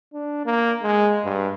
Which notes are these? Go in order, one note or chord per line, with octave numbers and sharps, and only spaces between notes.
D4
A#3
G#3
G2